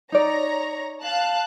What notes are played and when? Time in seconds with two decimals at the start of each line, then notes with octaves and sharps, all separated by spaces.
0.12 D#4 C#5 D5 A#5
1.03 F5 A5 F#6